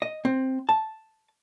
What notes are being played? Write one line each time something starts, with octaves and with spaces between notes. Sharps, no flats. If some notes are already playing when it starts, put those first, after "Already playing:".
D#5
C4
A5